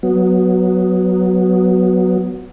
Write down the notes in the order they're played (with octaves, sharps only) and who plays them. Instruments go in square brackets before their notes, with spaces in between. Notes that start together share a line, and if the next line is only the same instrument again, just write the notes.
[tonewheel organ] F#3 B3